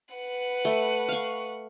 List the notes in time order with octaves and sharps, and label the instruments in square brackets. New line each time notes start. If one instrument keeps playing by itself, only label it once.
[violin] B4 F#5
[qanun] A3
F5 C#6